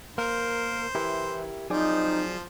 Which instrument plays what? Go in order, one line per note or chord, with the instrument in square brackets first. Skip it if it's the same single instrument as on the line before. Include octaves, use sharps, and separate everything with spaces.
[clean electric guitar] A#3 [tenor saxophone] A#4 [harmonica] C5
[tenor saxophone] E3 [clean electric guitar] E4 G4 A#4
[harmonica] F3 C5 [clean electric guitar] F#3 G#4 D5 [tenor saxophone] C4 [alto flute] D#4